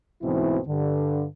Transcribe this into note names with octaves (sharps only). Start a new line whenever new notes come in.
D2 G#2 B2 E3 C4 E4
G2 D3